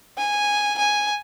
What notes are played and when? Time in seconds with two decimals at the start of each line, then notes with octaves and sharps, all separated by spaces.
0.18 G#5
0.78 G#5